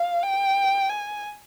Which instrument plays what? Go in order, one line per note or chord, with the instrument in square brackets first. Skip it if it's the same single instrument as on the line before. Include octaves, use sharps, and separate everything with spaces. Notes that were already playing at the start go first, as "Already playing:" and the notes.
Already playing: [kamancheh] F5
G5
G#5